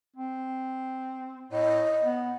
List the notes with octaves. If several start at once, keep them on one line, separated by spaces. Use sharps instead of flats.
C4
A2 D#5
B3